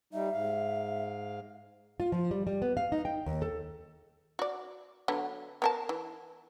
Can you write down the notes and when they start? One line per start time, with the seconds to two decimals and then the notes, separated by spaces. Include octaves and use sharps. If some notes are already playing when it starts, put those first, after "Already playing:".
0.13 G3 D#4 E5
0.32 G#2 F5
2.00 F4
2.12 F3
2.31 G3
2.47 G3
2.62 B3
2.77 F5
2.92 D#4
3.05 G5
3.26 D#2
3.42 A4
4.39 F#4 D5
5.08 D3 F#3 B3
5.62 B3 A#4 A5
5.89 E3